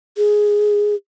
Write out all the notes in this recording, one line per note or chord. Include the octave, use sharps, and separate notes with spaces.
G#4